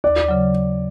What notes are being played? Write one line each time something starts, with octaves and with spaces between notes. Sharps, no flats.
D#2 D5
C#3 F#3